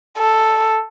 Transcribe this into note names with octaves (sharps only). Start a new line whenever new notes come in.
A4